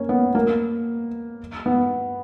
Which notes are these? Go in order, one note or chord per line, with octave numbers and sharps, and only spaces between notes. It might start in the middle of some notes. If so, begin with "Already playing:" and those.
Already playing: A#3 C#4
B3
A#3
B3